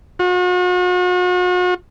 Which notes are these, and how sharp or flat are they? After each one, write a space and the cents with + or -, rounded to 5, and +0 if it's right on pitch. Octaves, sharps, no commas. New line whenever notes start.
F#4 -40